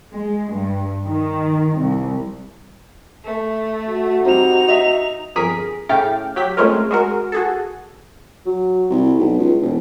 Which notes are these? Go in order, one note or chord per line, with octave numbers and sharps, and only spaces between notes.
G#3
G2
D#3
C2
A3
F#4
G3 C4 D#4 F7
D#5 E5
G1 F2 G#4 A#4 B6
A2 C#3 A3 G5 D6 F6
F#3 G4 B6
G#3 A3 C4 C#4 F4 A#4
G#3 F#4 A#4
F#4 G#4 A4
F#3
C2
B1
C#2
E1